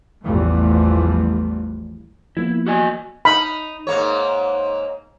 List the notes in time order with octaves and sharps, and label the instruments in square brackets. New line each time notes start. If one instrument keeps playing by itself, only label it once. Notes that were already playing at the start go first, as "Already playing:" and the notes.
[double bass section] A1 E2 E3 F3 G3 A3
[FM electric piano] F3 A#3 B3 [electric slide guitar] E4
[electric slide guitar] F#4 D#5 G#5
[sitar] D#4 [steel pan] B5
[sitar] G#2 A#3 C#5